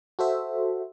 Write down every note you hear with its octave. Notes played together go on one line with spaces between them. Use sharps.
F#4 A4 C5 E5